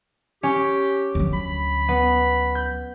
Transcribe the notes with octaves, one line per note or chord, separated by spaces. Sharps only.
C#4 G4
D2 F#3
B5
B3
G6